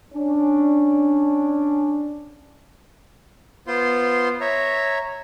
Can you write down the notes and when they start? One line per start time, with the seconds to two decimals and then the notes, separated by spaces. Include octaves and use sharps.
0.13 C#4 D4
3.67 B3 F4 C5 C6
4.41 C#5 E5 A#5